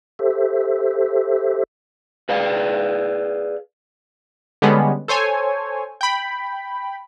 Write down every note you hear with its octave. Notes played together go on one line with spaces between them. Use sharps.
G4 A4 C5 E5
G#4 B4 D5 F5
D3 G3 G#3 B3 C#4
A4 C5 C#5 G#5
G5 B5